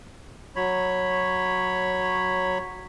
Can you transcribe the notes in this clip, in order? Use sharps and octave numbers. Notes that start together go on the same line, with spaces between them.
F#3 C#5 B5